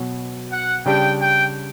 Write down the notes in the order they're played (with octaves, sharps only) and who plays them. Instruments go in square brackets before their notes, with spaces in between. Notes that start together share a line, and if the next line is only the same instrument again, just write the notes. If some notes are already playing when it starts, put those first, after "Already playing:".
Already playing: [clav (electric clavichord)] B2 F#3 B3
[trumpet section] F#5
[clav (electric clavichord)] C#3 G3 D4 G4 [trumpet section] G5
[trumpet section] G5